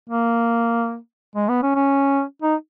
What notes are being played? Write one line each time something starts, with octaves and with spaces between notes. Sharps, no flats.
A#3
G#3
B3
C#4
C#4
D#4